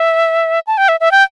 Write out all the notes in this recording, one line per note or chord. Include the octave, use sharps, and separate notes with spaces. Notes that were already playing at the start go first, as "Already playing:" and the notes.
Already playing: E5
A5
G5
E5
E5
G5